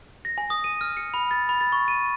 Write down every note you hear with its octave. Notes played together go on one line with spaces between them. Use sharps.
A#6
G#5
D#6
D#7
F6
C#7
B5
A6
B5
A6
C#6
D#7